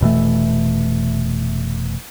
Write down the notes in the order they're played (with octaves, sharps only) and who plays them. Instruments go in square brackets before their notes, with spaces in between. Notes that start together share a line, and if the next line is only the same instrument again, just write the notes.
[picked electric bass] F1 B2 E3 A3